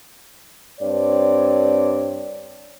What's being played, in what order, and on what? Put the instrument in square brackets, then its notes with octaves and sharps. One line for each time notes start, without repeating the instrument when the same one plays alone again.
[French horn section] G2 C4 C#5 D5